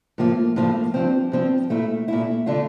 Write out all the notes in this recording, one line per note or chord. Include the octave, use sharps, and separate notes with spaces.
A2 F3 A#3 F4
A2 F3 A#3 F4
G2 F3 C4
G2 F3 C4
A#2 A3 E4
A#2 A3 E4
D3 A3 D4 F4